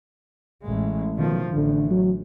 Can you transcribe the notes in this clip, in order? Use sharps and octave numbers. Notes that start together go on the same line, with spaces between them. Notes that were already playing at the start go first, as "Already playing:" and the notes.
A1 G#3
B1 D#3 F3
A1 D3
F#3